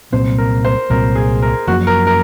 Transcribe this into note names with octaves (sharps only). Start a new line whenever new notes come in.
C2 A#2 F#3 C4 C5
A#4
C5
C2 A#2 F#3 C4 A#4
G#4
A#4
F#2 F3 A#3 F#4
A#4
A#4